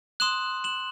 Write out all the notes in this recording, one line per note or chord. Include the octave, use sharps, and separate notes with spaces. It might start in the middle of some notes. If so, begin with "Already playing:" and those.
C6 D#6 F#6 E7 F#7
E7 F#7